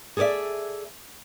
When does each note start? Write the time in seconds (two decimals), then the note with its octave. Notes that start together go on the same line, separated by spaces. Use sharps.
0.17 G#4 A4 C#5 D5 E5